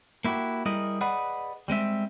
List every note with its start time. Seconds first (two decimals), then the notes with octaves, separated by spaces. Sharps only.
0.24 A#3 E4 F#4 G4
0.66 G3 E4 G#4 A#4 D#5
1.01 G#4 B4 D5 D#5 F#5 B5
1.68 G3 G#3 C4 E5